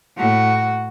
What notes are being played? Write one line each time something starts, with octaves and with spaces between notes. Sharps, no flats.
A2 F#4